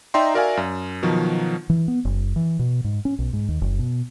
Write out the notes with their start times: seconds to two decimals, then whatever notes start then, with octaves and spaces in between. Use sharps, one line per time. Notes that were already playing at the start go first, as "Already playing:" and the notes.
0.14 D#4 D5 E5 G5 A#5 C6
0.34 F#4 A#4 D5 E5 F5 G#5
0.57 F#2
1.02 B2 D#3 F3 F#3
1.70 E3
1.88 B3
2.05 F#1
2.36 E3
2.59 B2
2.84 G#2
3.05 C#4
3.19 B1
3.33 G#2
3.49 D#2
3.62 F#1
3.79 B2